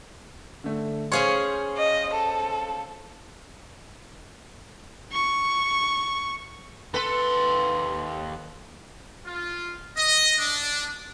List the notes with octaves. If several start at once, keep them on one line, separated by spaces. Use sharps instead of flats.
D3 A3
C#4 G#4 C5 C#5 F5 C6
D#5
A4
C#6
D#2 A4 B4 C6
F4
D#5
D4